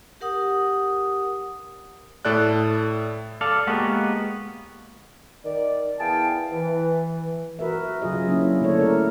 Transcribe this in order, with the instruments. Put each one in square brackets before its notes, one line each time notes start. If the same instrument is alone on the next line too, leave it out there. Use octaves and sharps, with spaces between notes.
[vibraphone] G4 A#4 F#5 D#6
[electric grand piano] A2 A4 D5 F#6
[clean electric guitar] A4 D5 F5
G#3 A#3 B3 F#4 G4
[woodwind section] D#3 D5
B3 E4 G#4 F5 G5 A5
E3
[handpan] F#4 A#4 B4 E5
C#3 F#3 F4 G#4 D#5
F#3 A#3 C#4 D4 E4
D3 A3 A#3 D4 A4 C#5
A3 E4 A#4